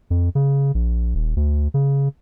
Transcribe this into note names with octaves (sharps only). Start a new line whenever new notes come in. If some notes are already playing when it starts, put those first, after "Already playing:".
F2
C#3
A#1
D#1
D2
C#3